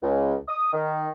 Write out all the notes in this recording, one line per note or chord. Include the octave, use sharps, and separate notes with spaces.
C#2
D#6
D#3